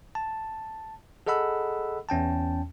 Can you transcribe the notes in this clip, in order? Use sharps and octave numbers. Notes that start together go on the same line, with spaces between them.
A5
G#4 A4 D#5 F#5 B5 E6
E2 C#4 G5 A5